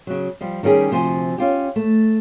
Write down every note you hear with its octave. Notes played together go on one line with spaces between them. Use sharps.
C#3 F#3
F3 G3
D#3 G3 C#4 G#4
D2 C3 F3 C5 G#5
C#4 F4 G4
A3